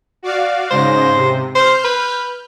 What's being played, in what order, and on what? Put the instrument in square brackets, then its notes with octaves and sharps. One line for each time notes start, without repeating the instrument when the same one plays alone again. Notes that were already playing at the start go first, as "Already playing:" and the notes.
[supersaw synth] F#4 D5 F5
[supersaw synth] G#2 C#3 A#6 [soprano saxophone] C5
[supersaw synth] C3
[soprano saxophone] C5 [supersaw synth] F6 G6
[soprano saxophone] B4